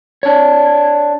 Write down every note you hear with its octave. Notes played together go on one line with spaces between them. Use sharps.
D4 C#5